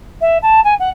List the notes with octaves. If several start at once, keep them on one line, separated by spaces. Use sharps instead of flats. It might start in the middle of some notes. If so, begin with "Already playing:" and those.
E5
A5
G#5
F#5